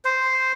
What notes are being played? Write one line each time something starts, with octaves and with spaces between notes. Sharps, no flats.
C5